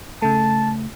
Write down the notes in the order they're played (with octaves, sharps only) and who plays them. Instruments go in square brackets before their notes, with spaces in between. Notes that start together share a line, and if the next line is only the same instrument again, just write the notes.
[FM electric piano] C#3 A3 [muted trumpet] A5